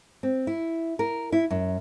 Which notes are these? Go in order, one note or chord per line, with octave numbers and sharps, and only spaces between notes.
C4
E4
A#4
E4
F#2